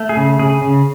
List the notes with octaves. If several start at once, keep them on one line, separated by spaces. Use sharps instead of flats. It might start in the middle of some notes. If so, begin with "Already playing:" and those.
Already playing: A3
G#4
C#3
C#3 G#4
C#3